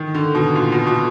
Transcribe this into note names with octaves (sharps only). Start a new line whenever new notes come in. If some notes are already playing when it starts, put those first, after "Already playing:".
Already playing: D#3
D3
B2
A#2
B2
B2